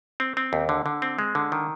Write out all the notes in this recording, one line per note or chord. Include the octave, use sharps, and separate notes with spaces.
C4
C4
D#2
D3
D3
C4
G#3
D3
D#3